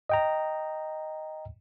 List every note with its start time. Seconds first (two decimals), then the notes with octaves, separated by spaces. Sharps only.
0.09 D#5 G5 A#5